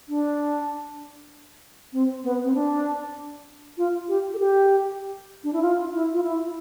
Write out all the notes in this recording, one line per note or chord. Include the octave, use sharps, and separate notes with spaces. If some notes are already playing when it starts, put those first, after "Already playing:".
D4
C4
B3
C4
D4
F4
G4
A4
G4
D4
E4
F4
E4
F4
E4